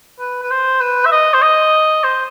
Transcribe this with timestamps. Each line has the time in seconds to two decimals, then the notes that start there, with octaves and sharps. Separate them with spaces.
0.19 B4
0.43 B4
0.51 C5
0.81 B4
1.05 E5
1.12 D#5
1.34 C5
1.42 D#5
2.04 C5